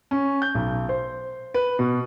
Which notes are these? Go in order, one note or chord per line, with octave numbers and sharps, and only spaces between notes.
C#4
G6
B1
C5
B4
B2